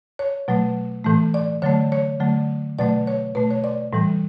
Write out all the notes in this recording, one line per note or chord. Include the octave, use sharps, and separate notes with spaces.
C#5
B2 F#3 A3
A2 E3 A3
D5
D3 F#3 A3 C#5
C#5
D3 F#3 A3
B2 F#3 A3 D5
C#5
B2 A3 B4
C#5
D5
A2 E3 G3